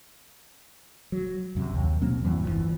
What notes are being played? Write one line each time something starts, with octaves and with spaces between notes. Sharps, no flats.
F#3
A#1 F#2 C3
D#2
B2 F#3 A#3 C4
E2 G2 E3 F#3
G1 E2 E3 F3